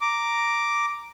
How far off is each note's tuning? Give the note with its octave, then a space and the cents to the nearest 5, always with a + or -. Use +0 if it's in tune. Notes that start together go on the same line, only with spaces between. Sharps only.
A#5 +0 D6 +0